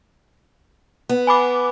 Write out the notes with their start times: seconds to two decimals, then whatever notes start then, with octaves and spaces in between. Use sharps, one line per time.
1.09 B3
1.27 G#5 B5 D6